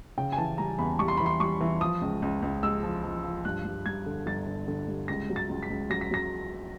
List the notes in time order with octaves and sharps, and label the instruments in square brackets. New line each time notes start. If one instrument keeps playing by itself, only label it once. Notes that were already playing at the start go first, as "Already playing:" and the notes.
[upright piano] C#3 G5
G#5
E3 A5
G3 A#5
E2 B5
G3 C#6
C6
E3 B5
C6
G3 C#6
E3
F3 D#6
C#2
C#2
C#2
G#3 E6
F3
F3
F3
G2 F#6
G3
G3 G#6
D3
G1 A6
D3
D3
G3
C#2 A#6
F#3
A6
C#2
B6
C#2
F#3 A#6
B6
F#3 A#6